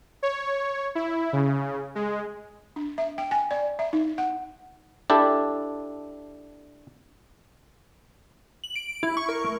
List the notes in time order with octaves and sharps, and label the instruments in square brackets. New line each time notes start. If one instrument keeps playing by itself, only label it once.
[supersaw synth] C#5
E4
C#3
G#3
[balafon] D4
E5
G5
G#5
D5
E5
D#4
F#5
[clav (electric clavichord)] D4 E4 G4 A4
[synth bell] F#7
D7
E4
C#6
A#4
A3